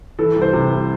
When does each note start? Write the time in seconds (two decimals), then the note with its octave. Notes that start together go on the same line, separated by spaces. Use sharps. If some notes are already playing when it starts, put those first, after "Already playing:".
0.19 E3 A4
0.36 C2
0.42 C5
0.53 C3
0.70 C2